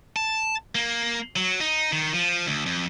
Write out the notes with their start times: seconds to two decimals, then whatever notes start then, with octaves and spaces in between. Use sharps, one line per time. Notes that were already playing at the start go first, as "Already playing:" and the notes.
0.16 A5
0.75 A#3
1.36 F#3
1.61 D#4
1.93 D#3
2.13 F3
2.47 D2
2.66 F2